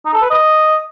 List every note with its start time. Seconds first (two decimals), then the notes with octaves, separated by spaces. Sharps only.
0.05 D#4
0.14 A4
0.22 B4
0.30 D#5